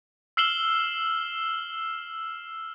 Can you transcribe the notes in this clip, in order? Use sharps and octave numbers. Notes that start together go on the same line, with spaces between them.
E6 F6 C7 E7 F#7 G7